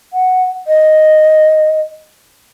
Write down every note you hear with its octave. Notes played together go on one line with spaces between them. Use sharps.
F#5
D#5